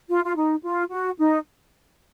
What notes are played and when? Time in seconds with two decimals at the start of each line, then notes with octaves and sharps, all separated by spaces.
0.09 F4
0.25 F4
0.36 D#4
0.64 F4
0.91 F#4
1.19 D#4